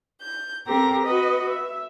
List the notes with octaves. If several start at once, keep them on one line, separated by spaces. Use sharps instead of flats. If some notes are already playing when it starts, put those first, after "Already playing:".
G6
C4 G4 A4 A#4 A#6
F#4 B4 D#5
E5